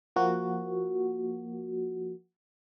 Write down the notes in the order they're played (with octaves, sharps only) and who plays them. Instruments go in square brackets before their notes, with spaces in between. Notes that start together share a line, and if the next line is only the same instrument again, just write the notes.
[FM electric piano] F3 A#3 F#4